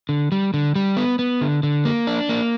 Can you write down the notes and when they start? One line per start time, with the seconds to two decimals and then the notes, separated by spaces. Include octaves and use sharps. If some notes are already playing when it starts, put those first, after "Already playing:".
0.09 D3
0.32 G3
0.54 D3
0.75 G3
0.97 B3
1.19 B3
1.41 D3
1.63 D3
1.85 A#3
2.07 D4
2.29 A#3